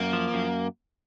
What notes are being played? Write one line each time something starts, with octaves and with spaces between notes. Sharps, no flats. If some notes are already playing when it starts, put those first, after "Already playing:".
Already playing: F#2 A#3
F3
F#2